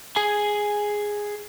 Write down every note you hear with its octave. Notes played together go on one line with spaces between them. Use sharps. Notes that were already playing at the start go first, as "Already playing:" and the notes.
G#4 G#5